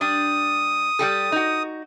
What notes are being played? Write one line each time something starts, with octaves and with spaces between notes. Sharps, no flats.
G3 D4 D#6
G3 G4 A4
D#4 F#4